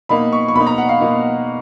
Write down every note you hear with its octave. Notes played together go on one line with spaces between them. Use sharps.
B2 A#3 D#4 B5
C#6
C#6
B2 A#3 D#4 B5
A#5
F#5
F5
B2 A#3 D#4